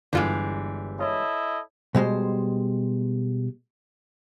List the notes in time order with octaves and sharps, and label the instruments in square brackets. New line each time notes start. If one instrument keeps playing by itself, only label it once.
[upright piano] G1 [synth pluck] D3 F4 [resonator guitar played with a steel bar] E3 G3 G#3
[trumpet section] E4 A4 D#5 [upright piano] C#5
[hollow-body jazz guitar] B2 G3 G#3 C5